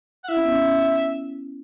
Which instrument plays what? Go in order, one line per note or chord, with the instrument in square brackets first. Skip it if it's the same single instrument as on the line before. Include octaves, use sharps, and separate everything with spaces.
[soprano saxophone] F#5
[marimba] E4 [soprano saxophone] E5
[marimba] C#4
B3
C#4